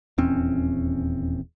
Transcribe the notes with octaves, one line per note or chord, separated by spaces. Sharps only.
D#1 E2 C4 C#4